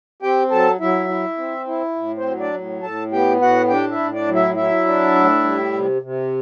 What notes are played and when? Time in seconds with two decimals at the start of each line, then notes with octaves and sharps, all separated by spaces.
0.22 C4 G4 G5
0.51 F#3 A4 A5
0.80 F#3 E4 E5
1.09 E4
1.38 C4
1.67 E4
1.96 A2
2.18 C4 C5
2.26 F#3
2.40 D4 D5
2.54 A2
2.83 A2 A4 A5
3.12 B3 G4 G5
3.42 A2 F#4 F#5
3.70 D4 G4 G5
3.91 E4 E5
3.99 A2
4.14 D4 D5
4.28 F#3
4.35 E4 E5
4.57 F#3 E4 E5
4.86 D4
5.16 A2
5.44 G3
5.73 C3
6.02 C3